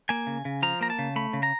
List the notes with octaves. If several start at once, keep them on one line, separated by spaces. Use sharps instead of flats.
A#3 G#5
C#3
C#3
F3 A#5
A#3 A#5
A5
C#3
A3 B5
C#3
A#5